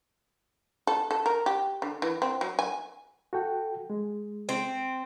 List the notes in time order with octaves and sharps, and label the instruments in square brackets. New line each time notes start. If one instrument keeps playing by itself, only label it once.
[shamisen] A4
A4
A#4
G4
D3
E3
C4
F#3
G#5
[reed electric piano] F#4 A4 G5
G#3
[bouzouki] C4